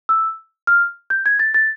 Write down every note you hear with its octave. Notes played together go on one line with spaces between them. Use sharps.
E6
F6
G6
G#6
A6
A6